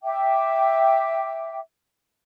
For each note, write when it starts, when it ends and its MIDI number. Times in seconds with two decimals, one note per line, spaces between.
0.03 1.59 76
0.03 1.59 79
0.03 1.59 86